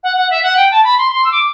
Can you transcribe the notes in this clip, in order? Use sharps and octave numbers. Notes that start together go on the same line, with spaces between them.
F#5
F#5
E5
F#5
G5
A5
B5
C6
C6
E6
D6